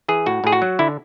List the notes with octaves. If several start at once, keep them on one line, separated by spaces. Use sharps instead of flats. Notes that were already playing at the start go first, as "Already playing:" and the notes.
E3 G#4
A2 F#4
A2 G#4
F#4
F#3
D3 E4